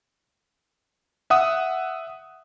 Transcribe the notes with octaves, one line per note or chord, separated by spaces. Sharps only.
E5 F#5 D#6